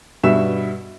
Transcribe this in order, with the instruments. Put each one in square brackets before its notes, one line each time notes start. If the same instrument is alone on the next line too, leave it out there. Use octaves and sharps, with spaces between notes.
[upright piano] G2 B2 E5 E7